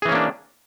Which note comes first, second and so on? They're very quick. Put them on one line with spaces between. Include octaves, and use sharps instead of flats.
G#4 E3 C#4 A#3 D4